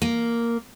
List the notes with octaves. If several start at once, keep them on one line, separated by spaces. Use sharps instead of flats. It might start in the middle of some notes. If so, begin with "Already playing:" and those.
A#3